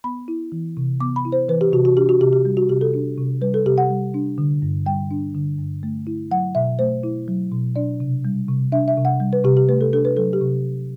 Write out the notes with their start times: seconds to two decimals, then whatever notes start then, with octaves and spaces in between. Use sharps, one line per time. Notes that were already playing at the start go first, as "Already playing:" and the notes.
0.04 B3 B5
0.28 E4
0.52 E3
0.77 C3
1.00 B3 D6
1.16 B5
1.25 E4
1.32 C5
1.49 E3 B4
1.61 G4
1.73 C3 F#4
1.85 F#4
1.97 D4 G4
2.09 F#4
2.21 C3 G4
2.33 G4
2.45 G3
2.57 F#4
2.69 C3 G4
2.81 A4
2.94 D4
3.18 C3
3.41 G3 B4
3.54 A4
3.66 C3 G4
3.78 F#5
3.90 G3
4.14 D4
4.38 D3
4.62 G2
4.86 G3 G5
5.11 D4
5.35 D3
5.59 G2
5.83 A3
6.07 E4
6.31 F#3 F#5
6.55 B2 E5
6.79 A3 C5
7.04 E4
7.28 F#3
7.51 B2
7.76 D4 D5
8.00 C3
8.25 G3
8.48 C3
8.72 D4 E5
8.88 E5
8.97 C3
9.05 F#5
9.20 G3
9.33 B4
9.44 C3 G4
9.57 G4
9.69 A3 B4
9.81 A4
9.93 D4 A4
10.05 B4
10.17 F#3 A4
10.33 G4
10.41 C3